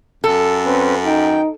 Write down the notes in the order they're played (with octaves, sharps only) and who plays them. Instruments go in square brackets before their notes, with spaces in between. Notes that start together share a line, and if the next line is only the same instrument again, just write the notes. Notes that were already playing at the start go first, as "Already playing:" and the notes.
[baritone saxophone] F#2 [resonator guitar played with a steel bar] A4
[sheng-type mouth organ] C4 C#4 B4
[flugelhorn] D#4 [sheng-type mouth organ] G5